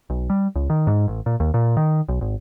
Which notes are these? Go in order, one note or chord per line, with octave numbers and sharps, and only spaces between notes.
B1
G3
C#2
D#3
G#2
A1
A#2
D#2
A#2
D#3
B1
G#1